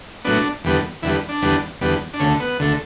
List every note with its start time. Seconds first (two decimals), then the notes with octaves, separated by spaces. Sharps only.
0.25 A2 F#3 B3 D4
0.64 E2 D3 G3 B3
1.03 E2 D3 G3 B3 E4
1.29 D4
1.42 E2 D3 G3 B3
1.81 E2 D3 G3 B3
2.14 D4
2.20 D2 D3 A3 C#4
2.40 B3
2.59 D2 D3 A3